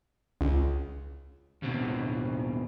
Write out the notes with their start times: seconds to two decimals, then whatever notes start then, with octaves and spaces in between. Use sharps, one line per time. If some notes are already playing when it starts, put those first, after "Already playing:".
0.41 C#2
1.62 D#2 B2 C4